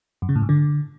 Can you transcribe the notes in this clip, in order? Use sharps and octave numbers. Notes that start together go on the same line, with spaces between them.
F#2
C#3
A2
G#2
D3